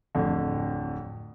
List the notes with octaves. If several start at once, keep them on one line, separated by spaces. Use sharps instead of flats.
D1 F2 D3